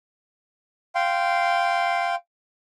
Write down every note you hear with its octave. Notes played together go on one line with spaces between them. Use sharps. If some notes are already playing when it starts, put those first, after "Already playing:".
F5 G5 C6